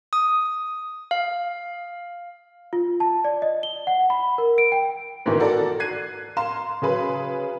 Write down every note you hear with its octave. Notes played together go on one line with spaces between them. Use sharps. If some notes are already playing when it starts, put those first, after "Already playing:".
D#6
F5
F4
A5
D5
D#5
G7
F#5
B5
A#4
D7
G5
G#2 B2 D#3 E3
F#4 A4 A#4 D5
F#6 G#6 C7 D#7
F5 A#5 C6 E7
C#3 F#3 G#4 B4